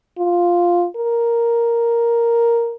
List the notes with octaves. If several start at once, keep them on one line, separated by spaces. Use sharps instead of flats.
F4
A#4